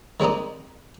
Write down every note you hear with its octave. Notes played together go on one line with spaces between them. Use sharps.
D#3 G#3 C4 D4 D#4